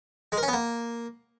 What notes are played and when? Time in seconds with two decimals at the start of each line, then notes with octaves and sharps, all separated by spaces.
0.32 G#3
0.38 A#4
0.43 C#4
0.48 B3
0.53 A#3